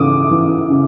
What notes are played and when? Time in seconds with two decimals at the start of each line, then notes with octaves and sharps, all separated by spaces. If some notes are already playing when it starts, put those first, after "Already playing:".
Already playing: C#3 E3 D6 D#6
0.31 E3
0.70 C#3